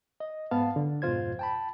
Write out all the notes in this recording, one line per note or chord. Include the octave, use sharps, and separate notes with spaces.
D#5
G#2 B3 F5 A5
D3
F2 G#2 B2 F4 C5 G#6
G5 A5 B5